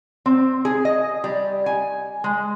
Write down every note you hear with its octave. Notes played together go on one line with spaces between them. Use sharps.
C4
G#4
D#5
G3
G#5
G#3